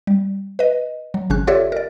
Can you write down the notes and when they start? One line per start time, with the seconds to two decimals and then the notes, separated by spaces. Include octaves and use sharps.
0.07 G3
0.59 B4 D#5
1.14 F#3
1.30 G#1 C#3 C#4 F#6
1.47 F4 G4 A4 C#5 D5 E5
1.72 A#4 D5